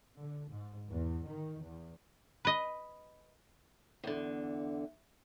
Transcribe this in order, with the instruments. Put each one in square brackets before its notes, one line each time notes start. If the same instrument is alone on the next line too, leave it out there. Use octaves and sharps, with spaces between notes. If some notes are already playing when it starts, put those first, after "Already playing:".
[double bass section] D3
G#2
E2
D#3
E2
[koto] B4 D#5
[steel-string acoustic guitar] E2 D3